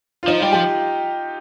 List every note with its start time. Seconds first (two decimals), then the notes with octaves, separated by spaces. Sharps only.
0.23 F4
0.28 F3 D#4
0.40 G3 F4
0.52 F3 G4